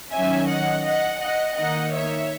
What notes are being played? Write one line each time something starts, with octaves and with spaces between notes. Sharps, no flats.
D#3 F#3 C#4 E5 G#5
D#5 F#5
D#5 F#5
D#5 F#5
D#3 A#3 D#4 D#5 F#5
C#5 E5